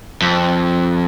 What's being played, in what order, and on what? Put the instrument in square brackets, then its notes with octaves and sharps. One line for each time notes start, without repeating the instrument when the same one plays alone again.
[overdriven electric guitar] F2